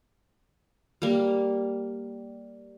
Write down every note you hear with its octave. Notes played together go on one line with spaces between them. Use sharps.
G3 A#3